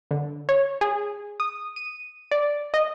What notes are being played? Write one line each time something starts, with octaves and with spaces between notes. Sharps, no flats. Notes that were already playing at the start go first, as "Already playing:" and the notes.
D3
C#5
G#4
D#6
D#7
D5
D#5